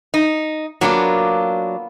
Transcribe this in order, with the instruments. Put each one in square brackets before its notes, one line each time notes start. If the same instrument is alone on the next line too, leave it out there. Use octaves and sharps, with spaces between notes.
[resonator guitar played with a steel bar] D#4
[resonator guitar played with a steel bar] F#3 D4 [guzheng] A#3 B3 F4